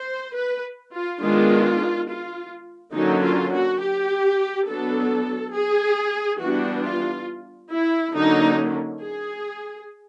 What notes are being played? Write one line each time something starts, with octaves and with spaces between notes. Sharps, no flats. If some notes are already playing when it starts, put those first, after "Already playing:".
Already playing: C5
B4
F4
D#3 G#3 B3 D4 F4
F4
D3 F#3 A#3 C#4 D#4
F4
F#4
G4
F#3 B3 D4 A4
G#4
E3 G3 B3 D4 F#4
F4
E4
D3 F#3 A#3 C#4 D#4
G#4